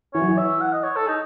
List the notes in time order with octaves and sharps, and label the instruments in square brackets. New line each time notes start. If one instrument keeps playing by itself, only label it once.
[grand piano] E3 [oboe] C#5
[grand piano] F#3
E3
[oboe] E5
F#5
D#5
C#5
A4
D#4